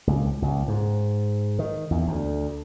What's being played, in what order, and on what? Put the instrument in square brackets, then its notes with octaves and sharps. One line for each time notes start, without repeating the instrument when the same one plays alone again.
[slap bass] C#2
C#2
G#2
D#3
E2
D2